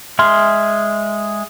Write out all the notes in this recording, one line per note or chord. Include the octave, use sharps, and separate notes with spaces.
G#3 G#4 E5 C6 F6